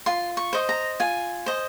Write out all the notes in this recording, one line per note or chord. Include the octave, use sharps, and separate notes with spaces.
F4 C6
C#6
C5 D#5
A#5
F4 G#5
C5 D#5